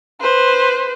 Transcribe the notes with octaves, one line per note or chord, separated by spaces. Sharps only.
B4 C5